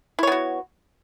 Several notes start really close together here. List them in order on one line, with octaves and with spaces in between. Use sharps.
E4 C#5 B3 F#4